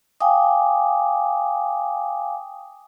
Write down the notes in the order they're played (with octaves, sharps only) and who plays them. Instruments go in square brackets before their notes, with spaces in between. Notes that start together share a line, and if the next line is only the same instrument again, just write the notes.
[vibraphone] F5 G5 G#5 D6 D#6